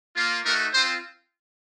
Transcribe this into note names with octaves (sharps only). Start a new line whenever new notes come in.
A#3 F4
A3 D#4 F#4 A#4
C4 F4 C5